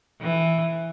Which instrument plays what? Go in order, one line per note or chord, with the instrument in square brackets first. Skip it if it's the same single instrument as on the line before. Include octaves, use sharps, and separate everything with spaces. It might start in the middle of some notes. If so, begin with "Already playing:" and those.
[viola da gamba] E3